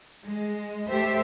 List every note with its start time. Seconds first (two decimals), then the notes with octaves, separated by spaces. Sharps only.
0.24 G#3
0.89 A3 G4 C5 E5